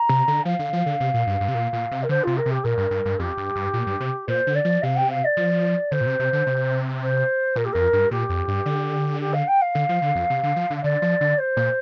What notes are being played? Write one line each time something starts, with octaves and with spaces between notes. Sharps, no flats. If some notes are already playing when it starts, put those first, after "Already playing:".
Already playing: A#5
C3
D3
F3 F5
D3
F3
D3
C3
A#2
G2
G2
C3
A#2
A#2
C3
A#4
D3 C5
C3 F4
A#4
C3
G4
A#2 A#4
G2
G2
G2
F2 G4
G2
G2
A#2
G2
C3
A#2 C5
D3
D5
F3
C3 F5
G5
F5
D5
F3
D3 C5
A#2
C3
C3
D3
C3
C5
A#2 A#4
G4
F2 A#4
G2
A#2 G4
F2
G2
D3
G4
F5
G5
F5
D3
F3
D3
F2
C3
D3
F3
D3
F5
D3 D5
F3
D3
C5
A#2